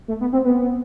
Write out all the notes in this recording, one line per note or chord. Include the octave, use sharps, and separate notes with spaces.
A3
B3
C4
B3